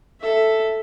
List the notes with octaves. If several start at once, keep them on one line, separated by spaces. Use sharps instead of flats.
A4 E5